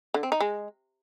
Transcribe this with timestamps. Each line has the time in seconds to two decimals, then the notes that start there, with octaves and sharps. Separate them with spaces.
0.14 D3
0.23 C4
0.32 D#4
0.41 G#3